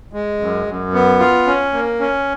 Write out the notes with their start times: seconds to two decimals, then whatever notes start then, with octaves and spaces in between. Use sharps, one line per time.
0.13 G#3
0.40 F#2
0.66 F#2
0.93 B3
1.19 F4
1.47 C#4
1.73 A#3
2.00 C#4